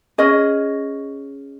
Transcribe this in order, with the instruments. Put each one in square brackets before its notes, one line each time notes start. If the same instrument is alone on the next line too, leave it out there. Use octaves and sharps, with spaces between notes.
[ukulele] C#4 G#4 D#5